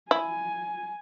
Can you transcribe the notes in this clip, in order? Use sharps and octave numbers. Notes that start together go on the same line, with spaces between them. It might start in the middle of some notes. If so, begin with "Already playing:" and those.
E4 G#5